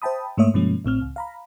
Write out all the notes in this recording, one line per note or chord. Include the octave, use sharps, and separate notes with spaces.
C5 E5 G5 A5 B5 D#6
G#2 A3 A#3 C#5 E5 D#6
G2 B2 F3 G#3 A#3 C#4
A1 A2 C4 F6
C#2
F5 A#5 B5